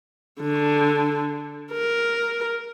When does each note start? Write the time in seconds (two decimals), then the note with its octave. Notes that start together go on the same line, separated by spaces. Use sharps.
0.41 D3
1.72 A#4